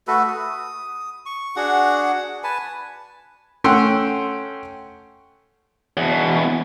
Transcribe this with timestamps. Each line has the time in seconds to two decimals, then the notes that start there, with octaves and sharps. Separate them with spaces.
0.07 A3 F#4 A4 B4
0.28 D#6
1.26 C#6
1.56 D4 F#4 G#4 F#5
2.44 B4 G#5 A5
3.64 A3 C#4 F#5 G5 C6 E6
5.97 E2 B2